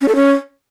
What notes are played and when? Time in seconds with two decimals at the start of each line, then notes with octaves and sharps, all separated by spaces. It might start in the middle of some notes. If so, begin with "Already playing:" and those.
0.01 C#4
0.08 A4
0.15 C#4